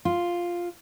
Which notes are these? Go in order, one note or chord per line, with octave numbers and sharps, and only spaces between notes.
F4